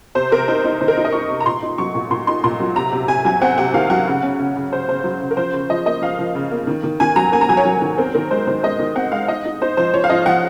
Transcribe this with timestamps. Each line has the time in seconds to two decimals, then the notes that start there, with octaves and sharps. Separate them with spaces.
0.15 C3 C5
0.32 C3 A#4
0.48 D#4 C5
0.65 D#4
0.81 D#3 C5
0.88 A#4
0.97 D#4
1.05 D#5
1.13 D#4 C#6
1.30 C3
1.40 A#5
1.46 A#2 C6
1.62 D#4
1.78 F#3 C#6
1.95 A#2
2.10 A#2 C6
2.27 D#4 C6
2.44 A#2 C6
2.60 F#3
2.76 C3 A#5
2.93 C3
3.08 C3 G#5
3.25 F#3 G#5
3.41 C4 F#5
3.58 C3 F#5
3.74 D#3 F5
3.90 F#3 F#5
4.07 C#3
4.23 C#4
4.39 C#3
4.56 C#3
4.72 C#3 C5
4.89 C#3 C5
5.04 F#3
5.21 C#3
5.31 A#4
5.37 F3 C5
5.53 C#3
5.70 F3 D#5
5.86 A#3 D#5
6.02 F3 F5
6.19 F3
6.35 C#3
6.52 A#3
6.67 D#3
6.83 D#3
7.00 D#3 G#5
7.16 F#3 A#5
7.32 A#3 G#5
7.41 A#5
7.49 F#3 G#5
7.57 C#5
7.65 F#3
7.82 D#3
7.98 C4 A#4
8.14 D#3 A#4
8.31 G#3 C5
8.47 D#3 C5
8.63 G#3 D#5
8.79 D#3
8.95 C4 F#5
9.12 G#3 F5
9.28 D#4 D#5
9.45 D#4
9.62 D#4 C5
9.77 F3 C5
9.94 F3 C#5
10.04 F5
10.10 F3 D#5
10.26 F3 F#5